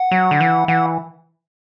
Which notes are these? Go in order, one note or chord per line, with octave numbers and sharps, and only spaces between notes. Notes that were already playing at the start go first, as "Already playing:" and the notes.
Already playing: F#5
F#3
D3
E3
E3 F#5